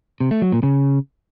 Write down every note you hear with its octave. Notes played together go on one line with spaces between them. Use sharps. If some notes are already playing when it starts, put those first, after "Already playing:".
C3
A3
F#3
A#2
C#3